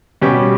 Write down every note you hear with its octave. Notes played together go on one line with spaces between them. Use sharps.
B2 G3 C#4 G4